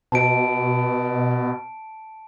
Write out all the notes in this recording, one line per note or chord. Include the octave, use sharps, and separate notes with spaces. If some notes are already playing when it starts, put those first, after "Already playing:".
B2 A5 D7